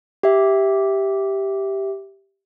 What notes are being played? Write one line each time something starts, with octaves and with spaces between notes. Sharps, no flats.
G4 E5